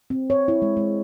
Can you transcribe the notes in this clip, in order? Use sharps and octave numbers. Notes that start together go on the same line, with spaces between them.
C4
C#5
E4
G#3
G#3